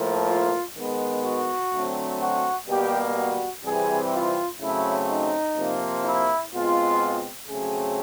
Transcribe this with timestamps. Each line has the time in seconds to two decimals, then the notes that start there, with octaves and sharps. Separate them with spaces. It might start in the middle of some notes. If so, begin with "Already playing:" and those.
Already playing: A2 F3 A#3
0.27 F4
0.75 D#3 G#3 B3
1.24 F#4
1.72 D3 F#3 A3 C4
2.20 F#4
2.67 B2 G3 A#3 G4
3.16 F#4
3.64 C3 E3 G3 C4 G#4
4.12 F4
4.60 C#3 F#3 A3 C4 E4
5.08 D#4
5.56 C3 F3 A#3
6.04 E4
6.52 B2 G#3 C4 F4
7.47 C#3 F#3 A3 C4 G#4